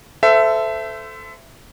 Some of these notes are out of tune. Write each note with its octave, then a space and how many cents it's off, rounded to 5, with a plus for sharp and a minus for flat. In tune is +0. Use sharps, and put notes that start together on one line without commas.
A4 +0 C5 -25 E5 +15